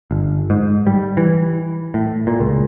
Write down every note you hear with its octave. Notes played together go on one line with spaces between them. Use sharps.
G1
G#2
G3
E3
A2
A#2
C#2